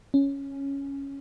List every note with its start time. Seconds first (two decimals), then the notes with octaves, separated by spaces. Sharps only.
0.14 C#4